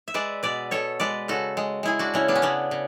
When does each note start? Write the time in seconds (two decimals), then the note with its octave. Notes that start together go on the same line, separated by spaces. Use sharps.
0.08 E5
0.14 G#3 B4 D5
0.43 B2 B4 D5
0.71 B2 A4 C#5
1.00 G#3 B4 D5
1.28 C#3 F#4 A4
1.57 G#3
1.83 G#3 E4 G#4
1.99 D4 F#4
2.14 C#3 C#4 E4
2.28 B3 D4
2.35 C#4
2.42 C#3 B3 D4
2.71 C#3